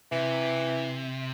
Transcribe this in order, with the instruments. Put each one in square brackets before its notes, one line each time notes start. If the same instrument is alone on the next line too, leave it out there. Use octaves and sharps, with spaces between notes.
[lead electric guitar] C3 [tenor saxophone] E3